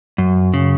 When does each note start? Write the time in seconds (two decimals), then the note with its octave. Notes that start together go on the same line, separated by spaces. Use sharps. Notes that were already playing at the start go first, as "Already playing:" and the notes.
0.18 F#2
0.54 C#3